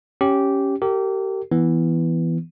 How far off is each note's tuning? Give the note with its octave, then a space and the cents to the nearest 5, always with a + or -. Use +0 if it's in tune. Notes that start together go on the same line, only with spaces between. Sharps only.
C#4 +0 G4 -10
G4 -25 A#4 -40
E3 +0 B3 +0